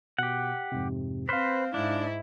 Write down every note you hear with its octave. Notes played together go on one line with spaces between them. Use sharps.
B2 G4 F#5
F2 G#2 C3
C4 B4 C5 F5 F6
G#2 D4 E4